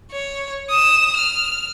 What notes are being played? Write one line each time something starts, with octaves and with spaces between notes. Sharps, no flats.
C#5
D#6 E7
F6